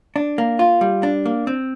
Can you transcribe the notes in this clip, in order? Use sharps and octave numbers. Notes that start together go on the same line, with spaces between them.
D4
A#3
F4
G3
D4
A#3
C4